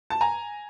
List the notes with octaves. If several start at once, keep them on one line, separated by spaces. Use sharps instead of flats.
A5
G#5 A#5